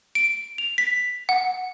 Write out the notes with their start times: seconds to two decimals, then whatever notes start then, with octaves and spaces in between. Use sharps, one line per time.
0.15 D7
0.58 F7
0.78 B6
1.29 F#5